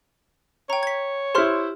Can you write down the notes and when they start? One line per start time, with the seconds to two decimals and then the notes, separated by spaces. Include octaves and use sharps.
0.70 C#5 G5 A#5
0.83 G#6 B6
1.35 E4 G4 C5 C6 F6